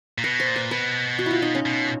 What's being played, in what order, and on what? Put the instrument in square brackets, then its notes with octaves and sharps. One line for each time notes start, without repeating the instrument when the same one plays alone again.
[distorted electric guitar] A#2
[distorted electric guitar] B2 [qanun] B4
[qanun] C5
[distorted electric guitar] A#2
[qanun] B4
[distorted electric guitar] B2 [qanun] B4
[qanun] F#4
E4 F4
D#4
C#4
[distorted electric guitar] B2